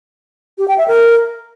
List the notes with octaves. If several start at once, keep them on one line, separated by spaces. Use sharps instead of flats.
G4
G5
E5
A#4